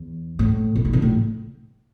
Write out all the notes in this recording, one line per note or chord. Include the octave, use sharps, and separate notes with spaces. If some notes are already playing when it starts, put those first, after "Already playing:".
Already playing: E2
A2
B2
D#3
B2
A2